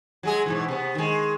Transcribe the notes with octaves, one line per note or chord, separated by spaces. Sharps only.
F#3 G#3 G#4
G#2 B2 E3
C3 B3
D#3 G#3